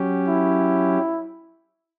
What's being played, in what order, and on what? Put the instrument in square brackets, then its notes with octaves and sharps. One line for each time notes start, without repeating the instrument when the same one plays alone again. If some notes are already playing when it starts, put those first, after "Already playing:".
Already playing: [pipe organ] F#3 C#4 G4
[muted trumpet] E4